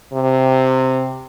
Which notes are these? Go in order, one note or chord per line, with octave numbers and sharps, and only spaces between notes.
C3